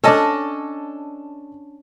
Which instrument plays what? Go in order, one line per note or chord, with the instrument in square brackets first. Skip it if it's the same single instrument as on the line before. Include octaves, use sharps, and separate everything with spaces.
[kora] C#4 D4 [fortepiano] A4 D#5 A5